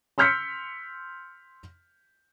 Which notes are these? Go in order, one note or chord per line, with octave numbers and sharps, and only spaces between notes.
C6 E6 F6 G6 B6 C#7